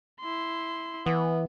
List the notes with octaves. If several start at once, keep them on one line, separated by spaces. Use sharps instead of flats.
E4 C6
E3 B3